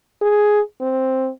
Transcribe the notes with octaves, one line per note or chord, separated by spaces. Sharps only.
G#4
C4